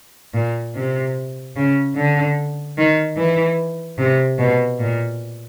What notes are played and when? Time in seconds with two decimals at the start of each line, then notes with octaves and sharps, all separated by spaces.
0.34 A#2
0.75 C3
1.56 C#3
1.96 D3
2.78 D#3
3.17 E3
3.98 C3
4.38 B2
4.79 A#2